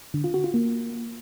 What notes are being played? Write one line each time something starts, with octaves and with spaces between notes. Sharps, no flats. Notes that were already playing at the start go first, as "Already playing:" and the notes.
D3
F4
F#4
F4
A#3